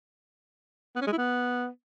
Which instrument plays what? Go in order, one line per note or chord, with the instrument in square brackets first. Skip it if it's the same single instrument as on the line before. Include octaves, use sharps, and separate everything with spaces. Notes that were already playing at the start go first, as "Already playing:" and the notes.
[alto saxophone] B3
C#4
G#3
E4
B3